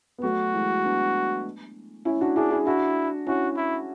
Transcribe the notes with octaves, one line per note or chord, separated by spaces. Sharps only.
B3
F#3 A3 F#4
E3 G#3
B3 D4
C#4 E4
D4 F#4
D4 E4 G#4
E4 G#4
D4 E4 F#4
C#4 E4 F#4
E4